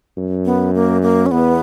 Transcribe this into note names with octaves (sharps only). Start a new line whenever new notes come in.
F#2
B3
A#3
A#3
C#4
E2 B3